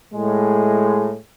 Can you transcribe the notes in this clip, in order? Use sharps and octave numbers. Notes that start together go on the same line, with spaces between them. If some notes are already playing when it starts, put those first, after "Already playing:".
A2 G#3